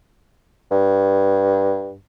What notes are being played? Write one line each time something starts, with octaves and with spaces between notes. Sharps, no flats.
G2